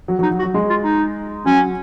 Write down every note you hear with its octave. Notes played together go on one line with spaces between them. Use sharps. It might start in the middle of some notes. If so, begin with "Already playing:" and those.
F#3
F#3
D#4
F#3
F#4
F#3
G#3
F4
D#4
F#3 C#4